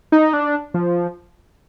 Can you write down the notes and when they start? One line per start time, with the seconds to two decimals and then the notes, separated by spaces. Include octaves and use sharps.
0.12 D#4
0.33 D4
0.74 F3